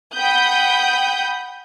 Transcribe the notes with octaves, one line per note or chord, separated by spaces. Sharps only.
F#5 G5 B5 D#6 G6